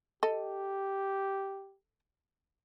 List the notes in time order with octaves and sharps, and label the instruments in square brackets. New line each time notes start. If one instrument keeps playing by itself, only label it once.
[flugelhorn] G4 [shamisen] A4 D#5